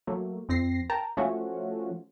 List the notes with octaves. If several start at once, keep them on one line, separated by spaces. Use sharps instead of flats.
F#3 A3 A#3
F2 C4 A#6 C7
A#4 G5 A5 A#5
F3 A3 C#4 F4 F#4